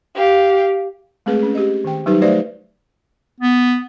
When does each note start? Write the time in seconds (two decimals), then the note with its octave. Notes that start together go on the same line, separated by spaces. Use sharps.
0.15 G4 F5
1.26 G#3 A3 C4 G#4 B4
1.43 C#4
1.55 G4 D#5
1.85 D#3 G5
2.06 F#3 G3 D#4 G4 B4 C5
2.21 A3 F#4 B4 C5 D5 E5
3.40 B3